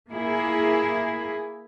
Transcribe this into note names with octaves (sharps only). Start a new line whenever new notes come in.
A#3 E4 G#4